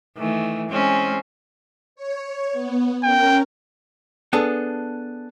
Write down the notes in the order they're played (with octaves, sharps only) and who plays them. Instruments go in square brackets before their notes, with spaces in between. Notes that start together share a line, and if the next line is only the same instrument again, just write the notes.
[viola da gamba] D#3 E3 A3
G#3 C4 C#4
[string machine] C#5
B3
[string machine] C#4 A#4 [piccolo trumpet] G5
[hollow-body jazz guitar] B3 D4 G#4 A4